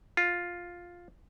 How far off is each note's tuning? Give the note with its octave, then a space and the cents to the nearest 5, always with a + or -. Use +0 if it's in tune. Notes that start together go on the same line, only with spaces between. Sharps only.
F4 +5